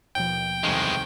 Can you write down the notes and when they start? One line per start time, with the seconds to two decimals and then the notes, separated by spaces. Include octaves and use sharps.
0.15 D#2 B2 F3 G5
0.63 C2 F2 D#3 E3 G#3